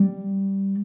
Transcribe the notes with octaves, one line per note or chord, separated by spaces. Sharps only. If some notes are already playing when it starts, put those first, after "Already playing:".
Already playing: G3